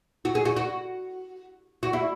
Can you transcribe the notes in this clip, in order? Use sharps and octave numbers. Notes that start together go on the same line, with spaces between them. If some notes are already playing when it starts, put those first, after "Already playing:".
F#4
G#4
F#4
F#4
F#4
E4